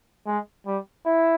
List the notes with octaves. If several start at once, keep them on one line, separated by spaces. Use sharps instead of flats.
G#3
G3
E4